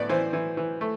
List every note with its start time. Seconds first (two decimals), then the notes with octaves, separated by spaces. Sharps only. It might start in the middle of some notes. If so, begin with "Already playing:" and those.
Already playing: A2 B3 D5
0.09 E3 C5
0.33 E3
0.57 E3
0.81 A3